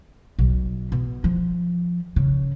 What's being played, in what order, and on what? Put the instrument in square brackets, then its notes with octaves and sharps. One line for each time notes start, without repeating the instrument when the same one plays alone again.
[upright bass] B1
B2
F3
C#3